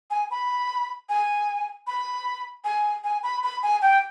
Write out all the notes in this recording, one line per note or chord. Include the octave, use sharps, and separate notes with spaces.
G#5
B5
G#5
B5
G#5
G#5
B5
B5
G#5
G5